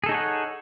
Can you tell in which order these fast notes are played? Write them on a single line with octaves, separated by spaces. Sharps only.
G#4 A4 D#4 C#5 F#5